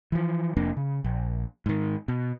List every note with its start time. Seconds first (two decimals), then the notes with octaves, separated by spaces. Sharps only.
0.12 E3 F3
0.57 F1 F2 A#3 D4
0.77 C#3
1.04 A#1
1.66 G#2 D#3
2.08 B2